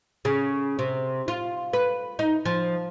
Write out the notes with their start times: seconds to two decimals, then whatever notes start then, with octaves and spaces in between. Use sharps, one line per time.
0.25 C#3
0.79 C3
1.28 F4
1.73 B4
2.19 D#4
2.45 F3